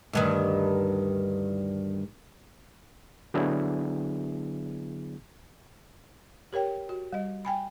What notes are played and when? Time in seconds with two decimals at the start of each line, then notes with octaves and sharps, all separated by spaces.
0.13 D2 G2 D#3
3.34 D3 F#3 B3 D4 E4 G#4
6.53 G4 A#4 C#5 G5
6.89 F#4
7.13 G3 D#5
7.45 G5 G#5 B5